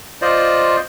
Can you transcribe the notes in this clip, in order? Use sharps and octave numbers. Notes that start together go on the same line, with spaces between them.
F4 C5 D5 D#5